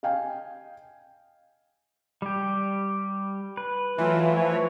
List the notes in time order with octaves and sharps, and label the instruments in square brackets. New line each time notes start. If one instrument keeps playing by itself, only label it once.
[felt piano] D#5 F5 G5 G#5
[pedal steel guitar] G3 G4
B4
[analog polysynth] E3 [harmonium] F#3 A3 F4
[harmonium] F3 C#5